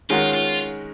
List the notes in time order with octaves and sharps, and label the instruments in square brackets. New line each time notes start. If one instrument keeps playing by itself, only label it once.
[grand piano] D#3 G#3 C#4 F#4 A#4 [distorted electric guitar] F4
[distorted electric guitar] F4